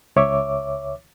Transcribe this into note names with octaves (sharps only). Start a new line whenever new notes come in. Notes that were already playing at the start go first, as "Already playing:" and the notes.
C#2 C#5 E5 D6